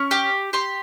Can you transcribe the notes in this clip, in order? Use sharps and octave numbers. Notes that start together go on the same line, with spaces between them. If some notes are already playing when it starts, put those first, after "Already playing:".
Already playing: C#4 C#6
G4
G4 C6